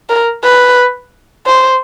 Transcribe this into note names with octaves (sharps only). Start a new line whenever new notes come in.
A#4
B4
C5